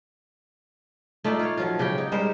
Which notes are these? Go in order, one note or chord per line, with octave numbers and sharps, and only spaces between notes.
A3 D#4 F4 D5
F4 C#5
F3 F#3 F4
C#3 G4 F#5 G5
D#4
G3 G#3 A#4 C5